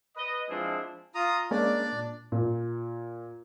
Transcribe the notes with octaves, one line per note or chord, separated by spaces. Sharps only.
B4 D#5
F3 G#3 C4 D4 E4 G#4
F4 A#5 D#6
G#3 A#3 C#4 D4 D5
A#2
A#2